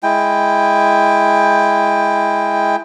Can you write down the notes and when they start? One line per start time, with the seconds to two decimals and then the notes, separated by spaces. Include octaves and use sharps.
0.03 G#3 E4 G5